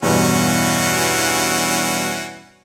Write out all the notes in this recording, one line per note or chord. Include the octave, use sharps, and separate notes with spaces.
E2 G2 B2 E3 C#4 F#4